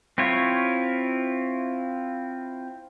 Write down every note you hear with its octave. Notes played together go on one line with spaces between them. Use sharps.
C4 E4 F4 C#5